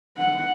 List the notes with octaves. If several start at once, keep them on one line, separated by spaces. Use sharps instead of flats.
F#5